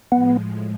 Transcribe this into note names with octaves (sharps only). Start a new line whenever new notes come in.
A2 F3 G#3 B3